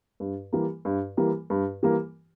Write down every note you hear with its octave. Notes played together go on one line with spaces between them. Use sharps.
G2
E3 G3 A#3
G2
E3 G3 A#3
G2
E3 G3 A#3